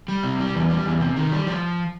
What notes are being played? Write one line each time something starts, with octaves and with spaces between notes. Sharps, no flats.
G3
C3
G3
E2
G3
E2
C3
D#3
G3
F3